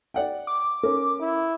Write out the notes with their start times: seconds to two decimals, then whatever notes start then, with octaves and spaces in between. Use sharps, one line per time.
0.14 D5 F#5 G5
0.47 D6
0.83 C#4 A#4
1.20 E4